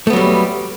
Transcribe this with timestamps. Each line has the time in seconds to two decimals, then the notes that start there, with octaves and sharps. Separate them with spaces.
0.07 A3
0.10 B3
0.13 F#3
0.16 G3